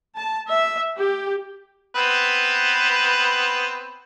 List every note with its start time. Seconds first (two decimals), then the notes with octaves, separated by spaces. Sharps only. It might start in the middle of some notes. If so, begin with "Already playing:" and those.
0.16 A5
0.50 E5
0.97 G4
1.95 B3 C4 B4